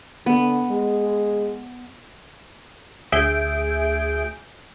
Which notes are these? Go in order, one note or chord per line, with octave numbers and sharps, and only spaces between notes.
D3 B3
G#3
D2 G#4 E5 G6 D7